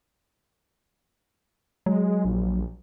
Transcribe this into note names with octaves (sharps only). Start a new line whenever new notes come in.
F#3 G#3
A#1